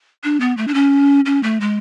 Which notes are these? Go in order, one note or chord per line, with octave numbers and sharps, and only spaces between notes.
D4
B3
A3
D4
C#4
C#4
A3
G#3